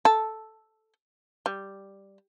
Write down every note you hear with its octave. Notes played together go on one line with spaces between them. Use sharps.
A4
G3